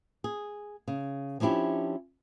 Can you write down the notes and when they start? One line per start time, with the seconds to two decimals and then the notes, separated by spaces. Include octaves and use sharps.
0.24 G#4
0.88 C#3
1.40 F3 C#4 D4 E4 G4